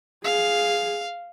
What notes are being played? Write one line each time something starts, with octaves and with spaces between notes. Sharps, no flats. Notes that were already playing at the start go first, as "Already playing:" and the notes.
G#4 F5